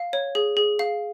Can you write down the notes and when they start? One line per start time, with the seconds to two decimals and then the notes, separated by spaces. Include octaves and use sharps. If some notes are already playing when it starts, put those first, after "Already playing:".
Already playing: F5
0.13 C#5
0.35 G#4
0.57 G#4
0.79 F5